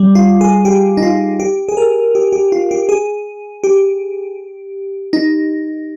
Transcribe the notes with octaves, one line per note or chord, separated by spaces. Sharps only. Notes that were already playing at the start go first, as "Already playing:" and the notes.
Already playing: G3
F4
G#4
G4
D#4
F4
G4
G#4
A#4
G4
G4
F4
G4
G#4
G4
D#4